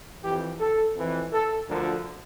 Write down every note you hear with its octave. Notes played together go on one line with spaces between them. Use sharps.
F2 E3 G4
A4
F2 E3
A4
D2 D3 F3 A#4